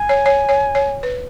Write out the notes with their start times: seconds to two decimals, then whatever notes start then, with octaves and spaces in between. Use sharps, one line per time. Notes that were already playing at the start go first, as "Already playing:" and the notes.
Already playing: G#5
0.09 C#5
0.26 C#5
0.49 C#5
0.75 C#5
1.03 B4